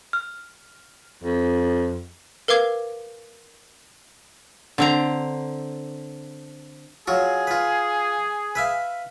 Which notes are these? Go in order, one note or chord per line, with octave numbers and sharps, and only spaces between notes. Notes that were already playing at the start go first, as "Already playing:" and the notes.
F6
F2
A#4 B4 F5 D6 G#6
D3 C4 A#5
F#3 F4 G#4 C#6
F4 B4
B4 E5 F5